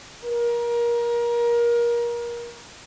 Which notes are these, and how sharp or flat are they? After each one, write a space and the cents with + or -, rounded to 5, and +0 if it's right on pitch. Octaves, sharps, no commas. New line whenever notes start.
A#4 +25